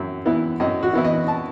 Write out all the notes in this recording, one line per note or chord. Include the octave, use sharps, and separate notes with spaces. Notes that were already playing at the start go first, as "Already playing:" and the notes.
Already playing: F#2 E4
E3 B3 E4
F#2 D#5
F#4
E3 B3 E4
D#5
A5